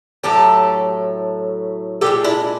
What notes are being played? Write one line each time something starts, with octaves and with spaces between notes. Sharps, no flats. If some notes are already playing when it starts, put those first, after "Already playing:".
A2 F#3 A3 G4 A4
A#2 F3 G#3 G4 A4
D4 E4